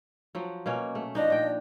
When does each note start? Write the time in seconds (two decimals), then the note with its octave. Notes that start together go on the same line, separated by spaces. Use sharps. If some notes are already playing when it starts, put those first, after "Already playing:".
0.35 F3 F#3
0.66 B2 A#3 C#4
0.95 A3
1.15 F3 D4 D#4 D#5
1.30 A#2 G5